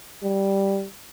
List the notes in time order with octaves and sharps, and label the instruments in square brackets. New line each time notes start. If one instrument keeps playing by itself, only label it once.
[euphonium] G3